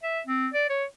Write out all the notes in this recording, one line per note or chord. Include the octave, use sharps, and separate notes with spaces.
E5
C4
D5
C#5